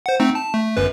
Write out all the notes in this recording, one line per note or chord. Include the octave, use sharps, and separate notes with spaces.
C5 F#5
A3 C4 D#4
A5
A3
G1 F#2 B4